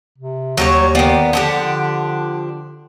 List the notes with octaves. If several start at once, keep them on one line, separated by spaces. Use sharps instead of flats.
C3
D#2 F#3 G3 C#5
D#3 B3 D5 F5 G5
D3 F3 D4 G4 F#5